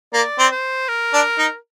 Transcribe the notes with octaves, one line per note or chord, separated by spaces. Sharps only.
A#3 D5
C4
C5
A#4
D4
D#4